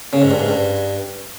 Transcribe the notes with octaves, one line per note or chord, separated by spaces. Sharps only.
C#3
G#2
G2
G#2
G2